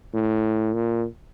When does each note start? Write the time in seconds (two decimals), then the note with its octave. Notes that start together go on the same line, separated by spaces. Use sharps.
0.14 A2
0.74 A#2